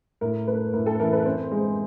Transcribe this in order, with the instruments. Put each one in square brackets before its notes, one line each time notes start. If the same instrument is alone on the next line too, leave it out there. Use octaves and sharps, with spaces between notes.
[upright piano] A2 [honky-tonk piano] A#4
[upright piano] A3 [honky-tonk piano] B4
[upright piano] A2 [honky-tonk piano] A#4
[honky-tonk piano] A4
[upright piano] E3 [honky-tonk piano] A#4
[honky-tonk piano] B4
[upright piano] C4 [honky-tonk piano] C5
[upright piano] G#3